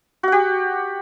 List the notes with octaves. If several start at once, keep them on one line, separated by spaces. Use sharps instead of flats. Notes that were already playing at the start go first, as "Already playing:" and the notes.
F#4 G4 F#5